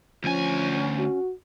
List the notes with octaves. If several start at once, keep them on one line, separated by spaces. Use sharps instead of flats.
D2 F3 C#4 G#5
F#4